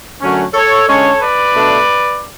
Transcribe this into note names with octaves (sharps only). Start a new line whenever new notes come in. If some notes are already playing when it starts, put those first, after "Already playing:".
F#2 D3 F#3 A3 C#4
A4 C#5
D3 G#3 C#4 A4 C#5
B4 D5
B2 A3 D4